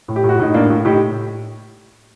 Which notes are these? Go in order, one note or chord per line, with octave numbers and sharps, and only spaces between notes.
A2
G4
A2
F#4
A2 D#4
A2 A#3 D4
A2
A2 D#4 G4